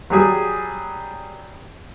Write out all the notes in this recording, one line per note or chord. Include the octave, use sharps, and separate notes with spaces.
F#3 G3 G#4